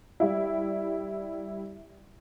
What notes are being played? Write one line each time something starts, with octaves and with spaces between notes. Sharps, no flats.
G3 E4